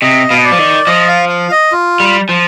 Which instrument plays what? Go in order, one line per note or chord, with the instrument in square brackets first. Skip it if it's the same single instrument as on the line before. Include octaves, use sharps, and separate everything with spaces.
[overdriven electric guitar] C3 [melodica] D#5
[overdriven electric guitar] B2 [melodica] F5
[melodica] D#5
D5
[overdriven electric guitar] F3
D#3
[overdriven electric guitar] F3 [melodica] D#5
[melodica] F5
F5
D#5
F4
[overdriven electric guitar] G3
F3